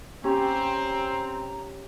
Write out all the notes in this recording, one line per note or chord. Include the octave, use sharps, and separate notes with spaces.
C4 C#4 G4 A#5